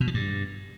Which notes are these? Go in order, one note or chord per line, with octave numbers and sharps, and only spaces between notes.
B2
F3
G2